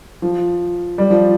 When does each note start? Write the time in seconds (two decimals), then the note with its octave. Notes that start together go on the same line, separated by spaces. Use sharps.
0.22 F3
0.98 G3
1.10 F3